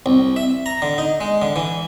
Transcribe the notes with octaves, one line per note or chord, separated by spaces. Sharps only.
C2
E5
A#5
D3
D#4
G#3
D3
E3